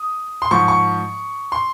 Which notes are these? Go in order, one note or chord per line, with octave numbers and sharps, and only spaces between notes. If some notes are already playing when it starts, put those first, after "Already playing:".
Already playing: D#6
C6
G#2 F3 C#6
C#6
C6